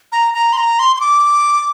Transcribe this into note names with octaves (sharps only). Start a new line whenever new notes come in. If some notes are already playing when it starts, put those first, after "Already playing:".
A#5
A#5
C6
A#5
C6
C6
D6